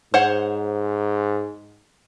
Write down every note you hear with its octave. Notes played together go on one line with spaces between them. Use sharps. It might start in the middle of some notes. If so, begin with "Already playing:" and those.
G#2 C5 C#5 F#5